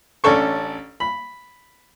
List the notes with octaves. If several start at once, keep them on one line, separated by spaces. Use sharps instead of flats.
A1 C#4 D4 A4 C#6
B5